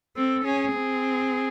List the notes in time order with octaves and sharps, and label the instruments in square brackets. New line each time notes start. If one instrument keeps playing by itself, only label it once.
[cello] C4 [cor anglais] A4
[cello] C#4 [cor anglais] G#4
[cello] C4